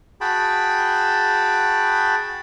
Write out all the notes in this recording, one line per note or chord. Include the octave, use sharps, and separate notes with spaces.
F#4 G#4 G5 A5 B5